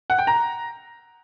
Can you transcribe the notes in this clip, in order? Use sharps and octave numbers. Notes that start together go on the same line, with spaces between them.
F#5
G5
A#5